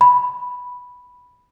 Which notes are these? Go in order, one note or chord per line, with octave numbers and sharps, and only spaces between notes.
B5